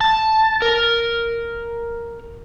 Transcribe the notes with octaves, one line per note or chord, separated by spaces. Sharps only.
A5
A#4